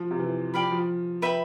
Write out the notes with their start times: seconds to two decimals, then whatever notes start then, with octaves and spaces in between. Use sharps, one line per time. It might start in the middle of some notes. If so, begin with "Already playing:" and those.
Already playing: F3
0.11 C3
0.19 E3
0.54 F3 G4 D5 F5 B5
0.71 F3
1.22 B4 E5 G5 B5